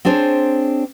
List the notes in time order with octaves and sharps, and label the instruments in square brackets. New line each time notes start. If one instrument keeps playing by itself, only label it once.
[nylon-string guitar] C4 D4 G#4 C5 C#5